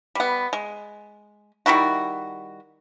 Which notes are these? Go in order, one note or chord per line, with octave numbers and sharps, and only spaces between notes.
G3 B3
G#3
D#3 G3 E4 F#4